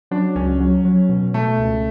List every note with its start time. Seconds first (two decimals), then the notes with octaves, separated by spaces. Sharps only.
0.11 F#3 D4
0.35 C#2 C#4
0.60 F#3
0.85 F#3
1.09 B2
1.34 B2 A3
1.58 C#2